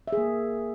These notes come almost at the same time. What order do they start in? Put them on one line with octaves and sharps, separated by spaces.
E5 G#4 A#3